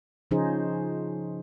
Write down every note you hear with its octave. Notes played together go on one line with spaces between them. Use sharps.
C#3 F3 C#4 D#4 G#4 C5